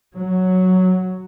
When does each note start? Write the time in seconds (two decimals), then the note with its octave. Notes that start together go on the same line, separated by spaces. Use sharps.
0.17 F#3